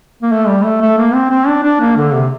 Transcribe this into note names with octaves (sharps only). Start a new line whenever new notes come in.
A#3
A3
G3
A3
A3
A#3
C4
C4
D4
D4
A#3
D3
C3